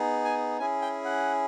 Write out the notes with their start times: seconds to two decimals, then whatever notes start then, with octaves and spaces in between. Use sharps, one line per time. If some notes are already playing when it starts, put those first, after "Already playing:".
Already playing: B3 D#4 G#4
0.25 G#5
0.59 C#4 E4 G#4 G#5
0.82 G5
1.05 F#5